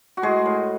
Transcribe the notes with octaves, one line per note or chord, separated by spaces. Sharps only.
F#4
A2 G#3 G#4
A2